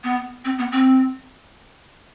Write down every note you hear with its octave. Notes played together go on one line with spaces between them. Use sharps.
B3
C4
B3
C4